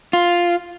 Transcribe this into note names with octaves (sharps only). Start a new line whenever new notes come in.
F4